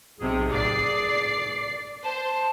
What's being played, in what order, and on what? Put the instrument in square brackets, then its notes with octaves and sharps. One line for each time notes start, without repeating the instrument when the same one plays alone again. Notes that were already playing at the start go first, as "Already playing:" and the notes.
[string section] B1 C3 [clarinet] G#4
[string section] D5 C7
[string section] C5 [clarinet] A5